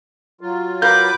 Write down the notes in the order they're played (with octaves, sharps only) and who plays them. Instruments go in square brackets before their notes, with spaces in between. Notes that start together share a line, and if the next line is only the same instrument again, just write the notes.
[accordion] F#3 F4
[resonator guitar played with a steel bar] A#4 F5 [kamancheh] B4 D6 [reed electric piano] G6